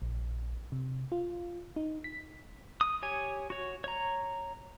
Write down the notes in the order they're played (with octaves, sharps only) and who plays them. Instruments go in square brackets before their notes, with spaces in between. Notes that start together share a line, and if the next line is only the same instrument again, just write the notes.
[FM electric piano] A#1
C3
F4
D#4
B6
[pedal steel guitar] D#6
G4 C#5 G#5
F#4 C#5
C#5 A#5